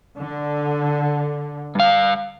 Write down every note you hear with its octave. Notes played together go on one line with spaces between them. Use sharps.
D3
G2 F5